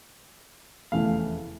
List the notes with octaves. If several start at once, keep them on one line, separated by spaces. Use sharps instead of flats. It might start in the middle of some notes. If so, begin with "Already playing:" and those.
F1 E2 C#3 E3 A3 F5